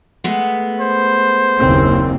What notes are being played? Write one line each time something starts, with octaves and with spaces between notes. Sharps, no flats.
G#3 A3 B3
C5
F#1 D#2 C4